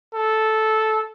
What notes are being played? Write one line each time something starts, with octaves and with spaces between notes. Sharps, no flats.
A4